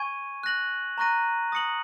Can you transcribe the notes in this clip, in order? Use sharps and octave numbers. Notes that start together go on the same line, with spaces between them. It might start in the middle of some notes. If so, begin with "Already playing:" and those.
Already playing: G#5 C#6 G#6 D#7
F#6 A#6 F#7
A#5 C#6 F#6 A#6 D#7
D#6 A#6 C#7 F#7